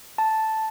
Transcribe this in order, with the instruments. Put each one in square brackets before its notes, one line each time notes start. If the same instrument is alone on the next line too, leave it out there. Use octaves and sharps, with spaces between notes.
[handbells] A5